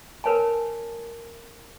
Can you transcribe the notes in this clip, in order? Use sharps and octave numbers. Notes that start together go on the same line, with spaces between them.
A#4 B4 C#5 G#5 A5